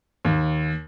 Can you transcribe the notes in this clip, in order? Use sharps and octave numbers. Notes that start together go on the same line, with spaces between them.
D#2